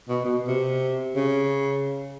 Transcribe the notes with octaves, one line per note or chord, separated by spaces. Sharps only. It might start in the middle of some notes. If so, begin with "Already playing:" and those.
B2
B2
C3
C#3